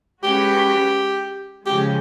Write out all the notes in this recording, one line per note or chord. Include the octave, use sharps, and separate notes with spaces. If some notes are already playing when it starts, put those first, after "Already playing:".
G#3 C#4 F#4 G4 B4
C#3 F3 G#3 G4